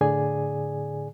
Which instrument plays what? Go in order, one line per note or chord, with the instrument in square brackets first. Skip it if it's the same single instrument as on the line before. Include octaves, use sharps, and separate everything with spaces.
[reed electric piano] A2 D3 G#4 D5 G#5